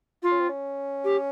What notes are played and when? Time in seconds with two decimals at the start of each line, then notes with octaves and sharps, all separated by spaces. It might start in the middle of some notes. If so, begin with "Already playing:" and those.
0.22 F4
0.32 C#4
0.40 C4
0.49 C#4
1.04 G4